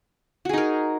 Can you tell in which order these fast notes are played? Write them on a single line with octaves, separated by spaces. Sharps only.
F#4 G#4 D#4 A#4